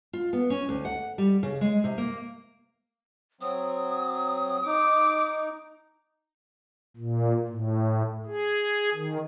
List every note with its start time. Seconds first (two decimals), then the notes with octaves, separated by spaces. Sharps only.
0.13 F4
0.33 B3
0.50 C#4
0.69 D2
0.85 F#5
1.18 G3
1.43 C#3
1.61 G#3
1.84 C3
1.98 A#3
3.41 F#3 C4 D#6
4.66 D#4 D6
6.97 A#2
7.47 A2
8.26 G#4
8.95 D#3